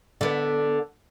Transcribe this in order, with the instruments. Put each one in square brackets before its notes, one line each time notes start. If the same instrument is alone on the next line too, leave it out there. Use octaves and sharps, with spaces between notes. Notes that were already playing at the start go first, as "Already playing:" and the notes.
[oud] D3 B3